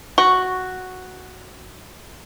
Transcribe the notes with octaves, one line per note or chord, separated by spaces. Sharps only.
F#4 C#6